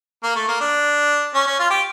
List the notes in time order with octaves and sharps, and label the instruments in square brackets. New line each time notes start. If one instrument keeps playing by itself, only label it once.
[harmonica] A#3
A3
A#3
D4
C#4
C#4
F4
G4